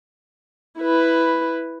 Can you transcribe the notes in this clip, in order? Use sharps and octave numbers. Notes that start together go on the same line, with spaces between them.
E4 B4